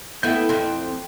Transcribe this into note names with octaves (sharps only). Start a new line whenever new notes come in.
A3 B3 E4 G5 G6
F2 C4